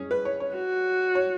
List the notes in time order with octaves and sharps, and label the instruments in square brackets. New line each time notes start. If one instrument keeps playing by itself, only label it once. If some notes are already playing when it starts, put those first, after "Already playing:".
Already playing: [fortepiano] C#4 G#4
B4
C#5
C#5
[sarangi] F#4
[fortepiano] C#5